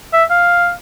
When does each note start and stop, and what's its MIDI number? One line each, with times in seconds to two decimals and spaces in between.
0.13 0.24 76
0.30 0.72 77